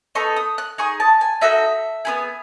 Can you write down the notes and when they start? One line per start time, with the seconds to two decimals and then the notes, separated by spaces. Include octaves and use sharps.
0.15 B3 D#4 A4 C#6
0.36 D#6
0.58 F#6
0.78 D#4 G#4 C#6
1.00 A5
1.21 G#5
1.41 D#4 F#4 A4 E5
2.05 B3 E4 G#4